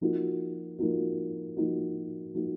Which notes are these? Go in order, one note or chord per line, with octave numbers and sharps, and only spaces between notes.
F3 A#3 D#4 F#4
F3 A#3 D#4 F#4
F3 A#3 D#4 F#4
F3 A#3 D#4 F#4